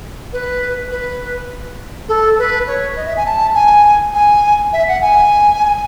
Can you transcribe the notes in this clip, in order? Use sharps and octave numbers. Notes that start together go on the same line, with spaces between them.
B4
B4
A4
B4
C#5
D#5
E5
G#5
A5
G#5
G#5
E5
F#5
G#5